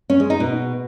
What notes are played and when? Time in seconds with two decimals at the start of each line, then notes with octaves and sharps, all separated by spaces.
0.10 C#4
0.20 G#3
0.30 D#4
0.40 B2